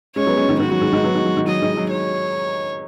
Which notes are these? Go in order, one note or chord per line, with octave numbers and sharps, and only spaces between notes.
G#3 C#4 C#5
F#3 B3
G#3 C#4
D#3 G#3
D#3 F#4
F#3
D#3 G#3
D#3 G#3
F#3 B3
D#3 G#3
F#3
D#3
F#3 D#5
D#3 G#3
F#3
C#5